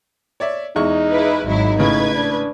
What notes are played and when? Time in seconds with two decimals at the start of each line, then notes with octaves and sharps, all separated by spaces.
0.40 C#5 D5 E5
0.76 E2 G#3 D#4 C#6
1.09 E4 G#4 B4
1.46 G#1 F#3 D#4 E4
1.79 A2 C#3 B4 G#6
2.15 D4